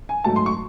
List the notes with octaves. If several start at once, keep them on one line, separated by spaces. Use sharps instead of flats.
G#5
G#2 F#3 A3 A5
C6
C#6